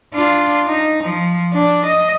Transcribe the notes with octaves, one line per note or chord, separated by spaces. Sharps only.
D4 F4
D#4
F3
D4
D#5